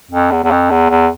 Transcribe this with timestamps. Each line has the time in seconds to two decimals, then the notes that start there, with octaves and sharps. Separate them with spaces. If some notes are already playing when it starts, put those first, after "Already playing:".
0.11 F2
0.31 E2
0.44 E2
0.51 F2
0.71 E2
0.90 E2